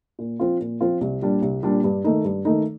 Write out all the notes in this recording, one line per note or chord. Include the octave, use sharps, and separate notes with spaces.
A#2
F3 C4 F4
A#2
F3 C4 F4
C2
A#2 G3 D4
C2
A#2 G3 D4
G2
D#3 A3 D#4
G2
D#3 A3 D#4